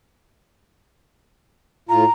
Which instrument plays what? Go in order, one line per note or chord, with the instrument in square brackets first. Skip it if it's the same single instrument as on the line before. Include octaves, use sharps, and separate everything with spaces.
[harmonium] A2 F4 [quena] A#5